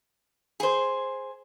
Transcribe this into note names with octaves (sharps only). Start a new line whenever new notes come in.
G#4 C5